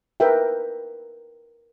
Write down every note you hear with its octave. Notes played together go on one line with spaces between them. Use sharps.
A#4 B4 E5 G5